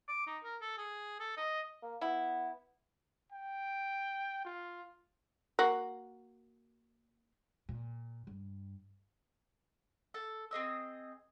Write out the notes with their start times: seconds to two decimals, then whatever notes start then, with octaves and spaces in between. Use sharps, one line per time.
0.08 D6
0.27 D#4
0.44 A#4
0.61 A4
0.78 G#4
1.20 A4
1.37 D#5
1.83 A#3
2.01 B3 E4
3.32 G5
4.45 F4
5.59 A#3 F#4
7.69 A#2
8.27 G2
10.14 A4
10.51 C4 G#4 D#5 E6